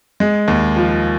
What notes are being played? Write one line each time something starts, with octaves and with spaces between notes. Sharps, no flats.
G#3
D#2
F3